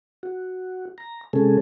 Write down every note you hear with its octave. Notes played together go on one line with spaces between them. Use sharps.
F#4
A#5
C3 G#3 C#4 G#4 A4